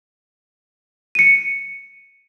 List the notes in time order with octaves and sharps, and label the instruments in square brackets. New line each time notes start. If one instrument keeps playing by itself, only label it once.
[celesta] C#7 D#7